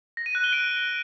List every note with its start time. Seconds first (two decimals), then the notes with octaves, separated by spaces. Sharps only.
0.17 A#6
0.26 D#7
0.35 F#6
0.44 G7
0.53 D7